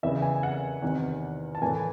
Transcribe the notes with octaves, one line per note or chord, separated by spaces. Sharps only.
E2 C#3 E3 E5
G#5
F#5
E2 C3 D#3
A5
A2 E3 G#5